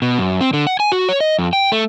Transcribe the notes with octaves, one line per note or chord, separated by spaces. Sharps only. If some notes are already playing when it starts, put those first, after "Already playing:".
B2
F#2
C4
D3
F#5
G#5
F#4
C#5
D#5
F2
G5
A3